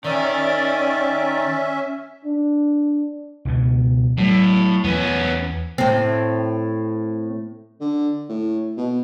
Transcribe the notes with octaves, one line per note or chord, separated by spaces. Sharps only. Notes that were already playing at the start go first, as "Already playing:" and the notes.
D#3 C#4 D5 E5
D4
C#2 B2 B3
A2 F#3 G3 B3
E2 B3 C#4
A2 C4
D3
A2
B2